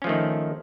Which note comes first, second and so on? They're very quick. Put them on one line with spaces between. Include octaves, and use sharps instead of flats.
C#4 F3 A3 D#3